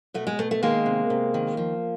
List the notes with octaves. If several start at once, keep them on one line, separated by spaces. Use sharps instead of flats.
B2 A3
G#3
B2 A3
A3
D#3 G#3 A#3
C3
C3
D#3
F3